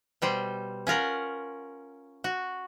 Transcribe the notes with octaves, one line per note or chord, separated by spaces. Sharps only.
B2 G3 C5
C#4 F4 A#4 F#5
F#4